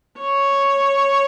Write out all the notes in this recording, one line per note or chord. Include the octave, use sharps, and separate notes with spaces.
C#5